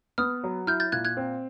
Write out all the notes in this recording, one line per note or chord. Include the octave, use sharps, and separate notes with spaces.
B3 D#6 F6
F#3
E4 F6 G6
G6 A6
A#2 F#6 G#6
F#6 G#6
C4